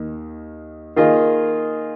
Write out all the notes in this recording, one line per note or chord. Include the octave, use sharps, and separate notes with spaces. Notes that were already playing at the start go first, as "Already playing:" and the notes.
Already playing: D#2 D#3
D#3 A#3 F4 G#4 D#5